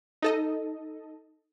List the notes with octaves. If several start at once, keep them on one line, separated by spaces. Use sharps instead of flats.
D#4 A4 D#5